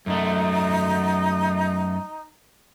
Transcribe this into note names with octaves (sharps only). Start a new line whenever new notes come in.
F#2 A3 D#4